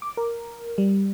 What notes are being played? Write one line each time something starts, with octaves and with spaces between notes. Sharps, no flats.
D6
A#4
G3